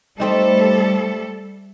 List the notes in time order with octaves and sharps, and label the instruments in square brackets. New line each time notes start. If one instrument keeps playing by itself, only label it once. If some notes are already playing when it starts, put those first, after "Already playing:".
[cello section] G3 A4 [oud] A3 C4 D#4